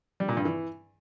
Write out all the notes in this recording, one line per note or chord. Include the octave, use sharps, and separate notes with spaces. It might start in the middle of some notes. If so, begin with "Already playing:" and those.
G3
A#2
G2
E3